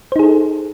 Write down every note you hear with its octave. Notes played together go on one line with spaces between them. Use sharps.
D#4 G#4 A4 C5